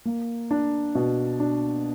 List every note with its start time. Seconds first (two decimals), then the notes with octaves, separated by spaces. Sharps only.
0.05 A#3
0.51 D4
0.95 B2
1.40 D4